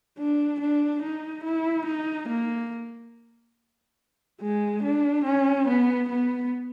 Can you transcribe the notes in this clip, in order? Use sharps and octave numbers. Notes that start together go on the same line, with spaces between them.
D4
D4
D#4
E4
D#4
A#3
G#3
D4
C#4
B3
B3